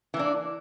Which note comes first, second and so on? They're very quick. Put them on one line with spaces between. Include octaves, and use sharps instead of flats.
E3 A#3 D4